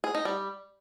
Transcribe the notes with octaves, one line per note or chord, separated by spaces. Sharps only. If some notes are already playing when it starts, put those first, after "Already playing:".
G#4
D#4
G3